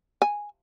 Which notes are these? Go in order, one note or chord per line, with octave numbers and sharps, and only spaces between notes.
G#5